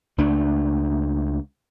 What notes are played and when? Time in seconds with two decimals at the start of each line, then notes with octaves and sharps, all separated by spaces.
0.18 C#2 A3 D4